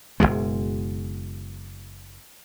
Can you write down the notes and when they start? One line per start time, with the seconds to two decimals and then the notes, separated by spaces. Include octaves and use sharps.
0.20 F#1 D#2 B2 G#3